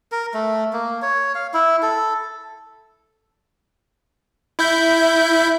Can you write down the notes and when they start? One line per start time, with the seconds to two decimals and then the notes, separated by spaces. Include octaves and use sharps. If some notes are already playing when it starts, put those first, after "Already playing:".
0.12 A#4
0.34 A3
0.73 A#3
1.02 C#5
1.35 F5
1.54 E4
1.83 A4
4.59 E4 E5 G6